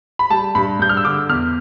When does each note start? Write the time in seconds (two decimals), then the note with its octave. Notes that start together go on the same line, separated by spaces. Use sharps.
0.19 B5
0.30 G3 A5
0.55 G2 B5
0.79 G2 G6
0.89 F6
0.97 E6
1.05 D3 D6
1.29 E2 F6